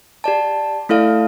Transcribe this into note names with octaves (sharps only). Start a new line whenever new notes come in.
G4 D5 A5
A3 E4 A4 D5 F5